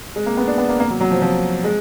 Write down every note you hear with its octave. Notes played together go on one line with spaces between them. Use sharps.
G#3
A#3
B3
D4
B3
A#3
A#3
F#3
F#3
F3
F3
G#3